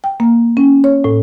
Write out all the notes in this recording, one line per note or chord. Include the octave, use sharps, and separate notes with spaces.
G5
A#3
C#4
C#5
A2